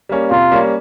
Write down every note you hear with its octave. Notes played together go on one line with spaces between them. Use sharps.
G3 A#3 C#4
C3 F4
G3 A#3 C#4